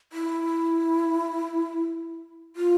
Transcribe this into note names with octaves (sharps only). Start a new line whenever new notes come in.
E4
F4